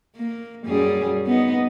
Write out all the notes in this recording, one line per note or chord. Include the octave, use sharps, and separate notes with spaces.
A#3
F#2 G3 G#4
B3 D#4